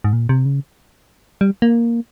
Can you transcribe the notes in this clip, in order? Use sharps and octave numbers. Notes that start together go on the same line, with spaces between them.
G#2
A#2
C3
C#3
G3
A#3